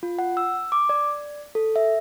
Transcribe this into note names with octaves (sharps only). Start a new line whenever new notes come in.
F4
F#5
E6
D6
D5
A4
E5